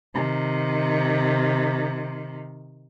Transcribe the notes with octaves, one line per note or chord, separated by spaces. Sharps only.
C3 D#3